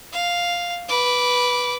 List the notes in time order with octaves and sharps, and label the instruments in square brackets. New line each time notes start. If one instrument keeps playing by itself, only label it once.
[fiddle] F5
B4 D6